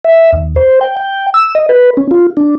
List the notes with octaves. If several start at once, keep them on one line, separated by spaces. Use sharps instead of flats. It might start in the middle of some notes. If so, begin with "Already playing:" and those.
E5
D#2
C5
G5
G5
E6
D#5
B4
C#4
F4
D4